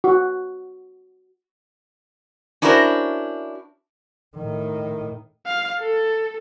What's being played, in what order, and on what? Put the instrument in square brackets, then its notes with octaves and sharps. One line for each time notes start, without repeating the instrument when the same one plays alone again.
[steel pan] F#4
[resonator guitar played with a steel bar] C#4 D4 E4 F#4 A#4 C5
[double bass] A2 D#3
[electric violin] F5
A4